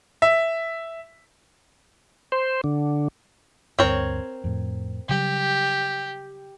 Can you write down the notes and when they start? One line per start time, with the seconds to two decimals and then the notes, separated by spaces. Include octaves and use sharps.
0.22 E5
2.32 C5
2.64 D3
3.79 D2 G2 C4 A#4 C#5
4.44 F2 A2
5.09 C#3 F#3 G3 G4